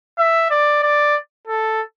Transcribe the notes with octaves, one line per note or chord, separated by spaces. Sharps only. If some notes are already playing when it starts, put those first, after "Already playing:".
E5
D5
D5
A4